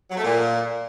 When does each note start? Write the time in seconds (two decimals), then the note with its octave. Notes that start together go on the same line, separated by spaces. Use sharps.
0.11 F#3
0.17 A3
0.24 A#2